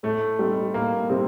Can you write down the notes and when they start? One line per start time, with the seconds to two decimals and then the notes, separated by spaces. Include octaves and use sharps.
0.03 A2 A3
0.39 G3 C4 D#4
0.74 A2 A#3
1.10 C3 G3 C4 D#4